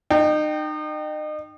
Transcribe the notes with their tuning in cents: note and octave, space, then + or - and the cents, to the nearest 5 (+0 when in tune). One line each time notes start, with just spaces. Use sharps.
D#4 -35 G5 -10